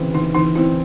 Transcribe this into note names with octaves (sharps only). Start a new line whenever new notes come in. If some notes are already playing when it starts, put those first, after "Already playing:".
Already playing: C#3 E3 C4
E3 D#4
E3 D#4
C4 E4